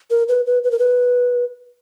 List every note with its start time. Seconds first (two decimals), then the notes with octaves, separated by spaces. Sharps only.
0.10 A#4
0.29 B4
0.46 B4
0.64 B4
0.71 A#4
0.79 B4